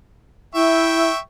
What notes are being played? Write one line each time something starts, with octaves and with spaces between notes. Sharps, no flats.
E4 E5 G5 C#6